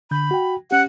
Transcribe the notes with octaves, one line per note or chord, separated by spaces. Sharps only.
D3 B5 G6
F#4 G5
C#4 G4 F#5